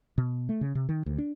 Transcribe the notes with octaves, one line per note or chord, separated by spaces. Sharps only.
B2
A3
C#3
C3
D#3
D2
D4